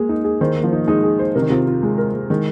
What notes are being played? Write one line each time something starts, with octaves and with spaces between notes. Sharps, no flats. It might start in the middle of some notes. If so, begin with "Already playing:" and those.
Already playing: G#3 A#3 G#4
D#4
G#4
D#3 C5
A#3
F3
D#4
G#3 D#4
G#4
C5
C3 A#4
D#3
C3 F4
F4
G#3
A#4
G#3
D#3 G#3